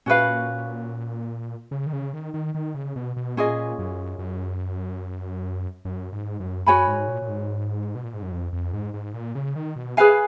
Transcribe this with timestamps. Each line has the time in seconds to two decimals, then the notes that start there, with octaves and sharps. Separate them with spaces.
0.06 A#2 C#4 F#4 B4 F5
1.71 C#3
1.86 D#3
1.93 C#3
2.13 D#3
2.34 D#3
2.55 D#3
2.74 C#3
2.96 B2
3.17 B2
3.36 A#2 C#4 F4 G#4 D#5
3.79 F#2
4.19 F#2
5.85 F#2
6.12 G#2
6.40 F#2
6.66 F#2 F#4 C#5 G#5 B5
6.88 G#2
7.08 A#2
7.22 A#2
7.28 G#2
7.95 B2
8.04 A#2
8.14 G#2
8.22 F#2
8.32 F2
8.53 F2
8.73 G#2
8.94 G#2
9.14 A#2
9.35 C#3
9.56 D#3
9.76 B2
9.97 G#4 B4 F5 G#5